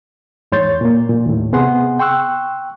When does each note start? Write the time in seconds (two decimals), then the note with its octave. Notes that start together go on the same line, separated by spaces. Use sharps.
0.52 E2 G#2 C#5 C6 G6 A6
0.81 A#2 A#3
1.10 A#2
1.26 D#2 A2
1.53 C3 B3 G#4 F#5 C6
1.99 G5 C6 C#6 E6 F#6